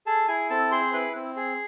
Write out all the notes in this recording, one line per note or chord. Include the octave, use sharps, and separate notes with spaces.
G#4 A4 A5
E4 G#4 G#5
C4 A4 A5
G#4 C5 C6
E4 B4 B5
C4
G#4